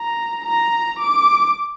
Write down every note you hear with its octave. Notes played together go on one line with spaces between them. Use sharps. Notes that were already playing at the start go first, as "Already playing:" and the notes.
Already playing: A#5
A#5
D6